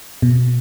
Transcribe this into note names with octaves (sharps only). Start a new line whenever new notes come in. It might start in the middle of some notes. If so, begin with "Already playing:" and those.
B2